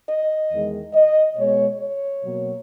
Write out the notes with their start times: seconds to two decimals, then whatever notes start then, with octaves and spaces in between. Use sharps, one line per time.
0.08 D#5
0.51 E2 D#3 G#3
0.94 D#5
1.37 B2 G#3 B3 C#5
1.80 C#5
2.23 B2 F#3 A#3